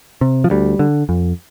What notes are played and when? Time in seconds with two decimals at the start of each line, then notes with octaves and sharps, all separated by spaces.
0.21 C3
0.44 F3
0.50 D2 G3
0.79 D3
1.09 F2